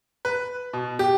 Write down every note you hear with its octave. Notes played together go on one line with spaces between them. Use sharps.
B4
B2
G4